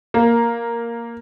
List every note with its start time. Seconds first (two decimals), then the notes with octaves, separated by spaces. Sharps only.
0.14 A#3